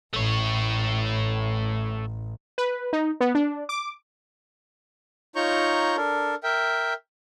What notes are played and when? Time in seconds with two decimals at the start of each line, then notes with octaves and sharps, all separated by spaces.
0.14 A1 A3 C#5
2.58 B4
2.93 D#4
3.20 B3
3.35 D4
3.69 D6
5.36 D#4 F4 C#5 A#5 C#6 G6
5.97 D4 A4 A#4
6.44 A#4 E5 G5